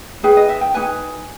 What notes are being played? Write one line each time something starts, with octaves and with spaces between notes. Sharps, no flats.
D#4 G#4 B4 G5
D#5
E5
G5
D#4 G#4 B4 G#5